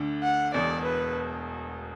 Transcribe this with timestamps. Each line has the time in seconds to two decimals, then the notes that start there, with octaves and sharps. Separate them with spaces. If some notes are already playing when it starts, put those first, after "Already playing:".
Already playing: D2 D3 D4
0.23 F#5
0.54 E1 E2 B2 D5
0.84 B4